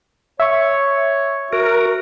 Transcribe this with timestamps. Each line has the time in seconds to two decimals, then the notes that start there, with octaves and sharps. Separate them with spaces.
0.40 C#5 E5 C#6
1.53 F#4 A#4